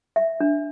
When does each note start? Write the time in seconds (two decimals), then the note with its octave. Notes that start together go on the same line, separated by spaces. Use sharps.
0.16 E5
0.40 D4